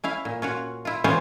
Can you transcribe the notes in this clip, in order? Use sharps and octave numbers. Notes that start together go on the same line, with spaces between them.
C#4 E4 F5
A#2
C#4 F4 F#4
E4 F4
C3 E3 B3 C#4 F4 C5